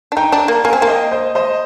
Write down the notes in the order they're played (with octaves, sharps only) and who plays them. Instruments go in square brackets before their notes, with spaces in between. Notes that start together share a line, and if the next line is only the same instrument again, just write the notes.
[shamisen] D4
[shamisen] D#4 [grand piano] G5 A#5
[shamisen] D4
A#3
[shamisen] A#3 [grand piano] F5 G#5
[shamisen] C4
A#3
[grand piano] D#5 G5
C5 D#5
C5 D#5